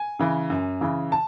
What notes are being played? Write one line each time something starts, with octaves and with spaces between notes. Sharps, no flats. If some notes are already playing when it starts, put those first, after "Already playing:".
Already playing: G#5
C#3 E3
F#2
C#3 E3
A5